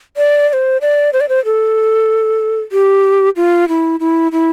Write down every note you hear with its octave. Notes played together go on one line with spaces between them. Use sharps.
D5
D5
C5
D5
C5
D5
C5
A4
G4
F4
E4
E4
E4